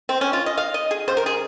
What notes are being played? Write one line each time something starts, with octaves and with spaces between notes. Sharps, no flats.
C4
C#4
F4
D#5
F5
D#5
G#4
C#3 G3 C5
A#4
G#4